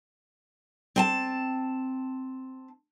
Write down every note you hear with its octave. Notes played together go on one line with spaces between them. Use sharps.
C4 G#5 A5